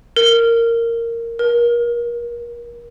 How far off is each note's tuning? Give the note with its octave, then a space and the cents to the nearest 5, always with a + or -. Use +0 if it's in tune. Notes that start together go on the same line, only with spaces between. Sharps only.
A#4 -10
A#4 +30